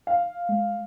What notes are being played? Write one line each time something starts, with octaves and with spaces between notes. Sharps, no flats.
F5
G#3